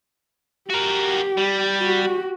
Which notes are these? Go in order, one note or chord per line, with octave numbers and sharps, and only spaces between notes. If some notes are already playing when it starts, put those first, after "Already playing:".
F#4 G4 A#4
G3
F#4 G4